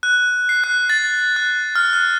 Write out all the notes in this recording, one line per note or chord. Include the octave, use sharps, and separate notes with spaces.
F#6
C7
F#6
A6
F#6
F6
F#6